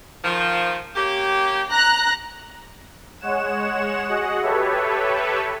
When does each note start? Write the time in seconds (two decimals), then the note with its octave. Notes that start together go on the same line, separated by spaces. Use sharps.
0.24 D#3 F3
0.96 A#3 C#4 G4
1.72 A#5 F#6
3.20 G#3 C#5 F#5 E7
4.09 F#4 G#4 D#5 F#5
4.41 G4 A4 B4 C#5 E5